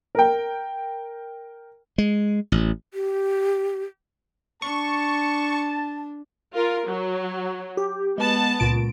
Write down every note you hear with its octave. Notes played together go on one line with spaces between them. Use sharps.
A#4 G5
G#3
A1
G4
D4 A5 C#6
F4 A#4
F#3
G4
G#3 B3 A5
C#2 A#2 D7